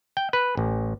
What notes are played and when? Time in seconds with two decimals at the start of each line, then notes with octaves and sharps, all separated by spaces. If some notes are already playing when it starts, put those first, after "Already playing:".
0.17 G5
0.33 B4
0.57 A1